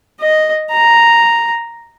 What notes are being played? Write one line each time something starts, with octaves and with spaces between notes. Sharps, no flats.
D#5
A#5